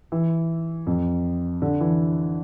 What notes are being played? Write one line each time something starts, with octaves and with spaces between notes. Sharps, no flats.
E3
F2
D3
E3